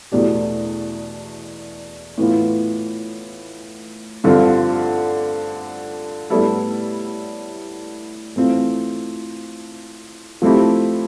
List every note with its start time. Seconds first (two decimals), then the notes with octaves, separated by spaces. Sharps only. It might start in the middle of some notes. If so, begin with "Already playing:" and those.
0.12 E2 B2 A3 D4 G4
2.18 A2 E3 B3 F4
4.24 G2 D3 F3 C4 F4
6.30 A2 G3 B3 E4 A4
8.36 E3 A3 C4 F4
10.42 F3 A3 C4 E4 G4